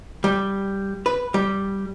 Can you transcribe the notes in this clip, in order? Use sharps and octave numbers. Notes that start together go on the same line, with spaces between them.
G3
B4
G3